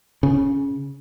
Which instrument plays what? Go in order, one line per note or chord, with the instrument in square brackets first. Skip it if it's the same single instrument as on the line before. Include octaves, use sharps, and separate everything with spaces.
[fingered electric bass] C#3